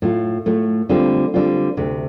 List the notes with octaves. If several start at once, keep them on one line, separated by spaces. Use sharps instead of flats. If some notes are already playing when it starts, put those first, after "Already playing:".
A2 A3 F4
A2 A3 F4
D3 G3 C4 F4
D3 G3 C4 F4
D2 C3 A3